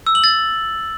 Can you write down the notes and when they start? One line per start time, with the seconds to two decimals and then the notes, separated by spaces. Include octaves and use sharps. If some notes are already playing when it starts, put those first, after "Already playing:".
0.07 E6
0.15 F#7
0.24 A6